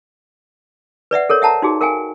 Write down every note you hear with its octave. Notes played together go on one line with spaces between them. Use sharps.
B4 D5 E5 F#5
A4 A#4 C#5
E5 F#5 A5 A#5
D#4 F#4 G#4
A#4 F5 G5 G#5